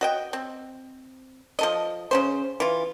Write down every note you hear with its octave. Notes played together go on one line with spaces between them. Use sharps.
F#4 D#5 G5
C4
F3 A4 D#5
C#3 C#4 C5
E3 F4